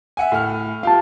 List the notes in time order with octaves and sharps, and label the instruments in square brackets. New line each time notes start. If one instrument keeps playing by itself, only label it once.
[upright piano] E5 F#5 G#5
A2 F6
[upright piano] F4 G4 [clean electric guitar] F5 A5